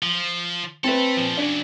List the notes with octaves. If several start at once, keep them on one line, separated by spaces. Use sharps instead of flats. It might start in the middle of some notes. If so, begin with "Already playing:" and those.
F3
C4 A4 B4 E5
A#2 F3
C#3 F#3 D4